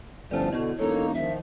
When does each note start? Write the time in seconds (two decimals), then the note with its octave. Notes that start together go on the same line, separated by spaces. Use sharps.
0.31 G1 F3 C#4 E4 A4 C5 D5
0.53 B2 D3 E4 F#4 D#5
0.79 E1 A#3 D#4 A4 C#5
1.14 D#3 F3 E5